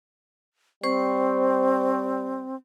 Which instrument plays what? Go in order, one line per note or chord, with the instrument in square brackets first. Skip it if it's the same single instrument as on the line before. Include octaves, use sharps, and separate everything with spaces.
[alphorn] G3 [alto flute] C4 [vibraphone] C5 C#6